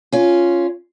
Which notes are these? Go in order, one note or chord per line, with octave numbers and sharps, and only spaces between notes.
C#4 F4